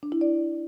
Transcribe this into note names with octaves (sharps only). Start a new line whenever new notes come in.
D4
E4
D5